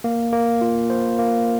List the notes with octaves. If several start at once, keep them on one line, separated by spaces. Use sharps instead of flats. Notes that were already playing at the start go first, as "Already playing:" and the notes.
A#3
A#3
F4
C5
A#3